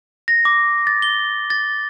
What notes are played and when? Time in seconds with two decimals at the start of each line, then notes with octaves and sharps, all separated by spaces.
0.28 A#6
0.45 D6
0.87 A6
1.02 G7
1.50 A6